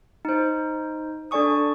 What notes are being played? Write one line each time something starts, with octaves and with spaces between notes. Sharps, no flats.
D#4 C5
D4 A4 D5 G#5 C#6 D#6